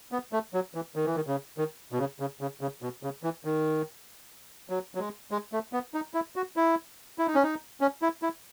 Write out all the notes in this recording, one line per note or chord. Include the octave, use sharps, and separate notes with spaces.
B3
A3
F#3
E3
D#3
E3
D#3
C#3
D#3
B2
C#3
C#3
C#3
C#3
B2
C#3
E3
D#3
F#3
F#3
G#3
G#3
A3
B3
D#4
E4
F#4
E4
E4
D#4
C#4
D#4
C#4
E4
E4